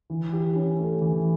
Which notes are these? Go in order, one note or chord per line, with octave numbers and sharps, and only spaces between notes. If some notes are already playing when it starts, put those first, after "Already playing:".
E3
G4
C#4
A3
E3